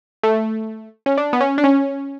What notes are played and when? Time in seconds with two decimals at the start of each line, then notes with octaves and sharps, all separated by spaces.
0.23 A3
1.06 C#4
1.17 D4
1.33 B3
1.41 C#4
1.58 D4
1.64 C#4